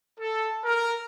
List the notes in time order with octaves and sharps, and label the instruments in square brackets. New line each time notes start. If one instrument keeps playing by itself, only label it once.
[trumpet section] A4
A#4